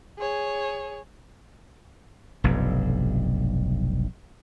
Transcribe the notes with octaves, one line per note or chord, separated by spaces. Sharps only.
G#4 C#5
F1 B1 G2